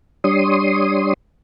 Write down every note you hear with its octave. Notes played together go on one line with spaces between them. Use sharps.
G3 D4 C#5 C6 D#6